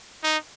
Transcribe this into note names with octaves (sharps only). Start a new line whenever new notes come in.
D#4